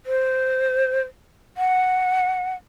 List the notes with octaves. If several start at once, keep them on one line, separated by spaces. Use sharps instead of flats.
C5
F#5